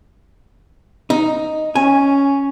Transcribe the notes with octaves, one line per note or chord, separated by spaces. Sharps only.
D#4
C#4 G#5